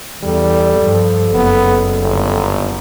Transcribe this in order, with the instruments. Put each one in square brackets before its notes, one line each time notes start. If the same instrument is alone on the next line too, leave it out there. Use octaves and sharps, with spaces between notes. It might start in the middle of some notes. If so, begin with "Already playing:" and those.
[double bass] E2 [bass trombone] G3 [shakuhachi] A4
[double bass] G2 F3
[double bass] F#1 [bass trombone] B3
[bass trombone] G1